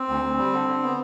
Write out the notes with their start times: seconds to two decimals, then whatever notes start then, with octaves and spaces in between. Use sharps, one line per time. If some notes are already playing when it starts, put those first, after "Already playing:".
Already playing: C4
0.08 D2
0.23 D2
0.38 G3
0.53 D3
0.68 D3
0.83 B3